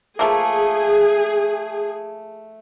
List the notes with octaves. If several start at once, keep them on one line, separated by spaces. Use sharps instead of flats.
F3 A3 A#3 G#4